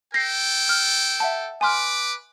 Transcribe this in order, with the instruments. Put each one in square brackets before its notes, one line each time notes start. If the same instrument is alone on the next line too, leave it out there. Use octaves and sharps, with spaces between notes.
[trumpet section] A4 G5 [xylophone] A#6 C7
[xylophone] F6
E5 F#5 A5
[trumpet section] B4 D6 [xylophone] G#5 C6 F6